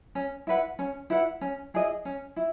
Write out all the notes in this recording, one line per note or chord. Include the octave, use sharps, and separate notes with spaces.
C#4
E4 B4 F#5
C#4
E4 B4 F#5
C#4
E4 G#4 D#5
C#4
E4